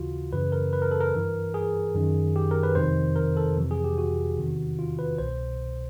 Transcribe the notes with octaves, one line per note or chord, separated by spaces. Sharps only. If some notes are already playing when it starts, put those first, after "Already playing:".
Already playing: D#2 C#3 E3 F4 F#4
F#2 C#3 E3 B4
A#4
B4
A#4
A4
A#4
G2 E3
G#4
F#2 D#3
G4
A#4
B4
F2 C3 D#3 C5
A#4
A4
F2 C3 E3
G#4
G4
F#4
E2 C3 D#3
F4
B4
C2 B2 C5